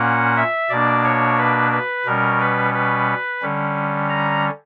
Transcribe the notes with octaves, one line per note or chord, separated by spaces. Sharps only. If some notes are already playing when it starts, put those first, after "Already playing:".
Already playing: A#2 A#3 C#4 F#5
E5
B2 A#3 D4 D5
C#5
B4
B4
B2 G3 C#4 A#4
B4
B4
D3 G3 C#4
A#5